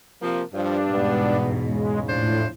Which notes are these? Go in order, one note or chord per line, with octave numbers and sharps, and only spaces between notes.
C3 F3 A#3
G2 F3 D4
E2 G#2 B2 B3
C#3 G#3
A2 F3 D4 C5